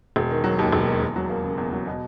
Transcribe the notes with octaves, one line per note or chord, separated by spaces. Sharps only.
E1
D#3
F#3
D#2
E1
D#3
E2
F#3
A#3
C#3
E2
F#3
B2